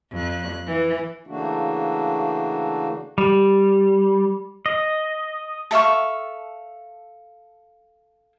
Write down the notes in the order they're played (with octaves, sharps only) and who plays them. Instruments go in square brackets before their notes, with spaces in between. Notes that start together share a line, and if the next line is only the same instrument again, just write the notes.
[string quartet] F2 F#6
E3
[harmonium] C#3 E3 A3 A#3 D4 F#4
[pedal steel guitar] G3
D#5
[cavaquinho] A4 E5 F5 C#6